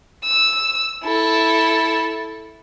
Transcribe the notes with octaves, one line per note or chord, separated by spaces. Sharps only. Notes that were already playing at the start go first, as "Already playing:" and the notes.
E6
E4 A4